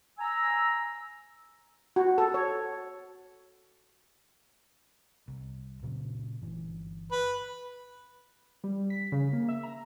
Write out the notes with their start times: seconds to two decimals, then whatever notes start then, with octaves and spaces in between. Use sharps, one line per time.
0.18 G#5 A#5 E6
1.96 F#4
2.18 A4
2.34 C#5
5.28 C2
5.83 A#2 C#3 F#3
6.41 G1 E3
7.12 B4
8.64 G3
8.90 B6
9.12 C#3
9.33 A#3
9.48 E5
9.63 A#5